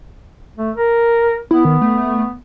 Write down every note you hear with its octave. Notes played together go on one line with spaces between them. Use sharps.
A3
A#4
B3 E4
D#3
A3